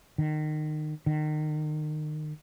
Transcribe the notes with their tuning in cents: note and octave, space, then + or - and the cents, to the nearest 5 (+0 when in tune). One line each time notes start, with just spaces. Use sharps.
D#3 -25
D#3 -30